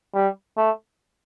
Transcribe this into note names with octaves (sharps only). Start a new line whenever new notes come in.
G3
A3